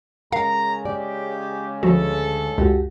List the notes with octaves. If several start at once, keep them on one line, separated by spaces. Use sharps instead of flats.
C#3 G#3 A#4 F5 A#5
G4 D5
D2 F3 F#4 A4
C#2 F#2 F#4 G4